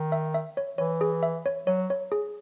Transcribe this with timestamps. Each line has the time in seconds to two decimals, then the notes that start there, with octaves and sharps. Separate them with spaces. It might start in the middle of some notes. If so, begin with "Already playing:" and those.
Already playing: D#3
0.12 E5
0.34 E5
0.57 C#5
0.78 E3 C#5
1.01 G#4
1.23 E5
1.46 C#5
1.67 F#3 C#5
1.90 C#5
2.12 G#4